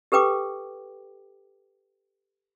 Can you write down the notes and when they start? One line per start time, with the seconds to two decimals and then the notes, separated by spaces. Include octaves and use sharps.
0.12 G4 A4 B4 G5 D6